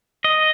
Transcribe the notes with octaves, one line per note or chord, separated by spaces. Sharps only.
D#5